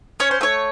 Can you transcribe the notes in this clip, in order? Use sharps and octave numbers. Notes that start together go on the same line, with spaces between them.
C#4 C#5
C5
A3 C#5